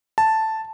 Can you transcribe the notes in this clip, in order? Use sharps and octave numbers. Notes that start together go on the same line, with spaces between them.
A5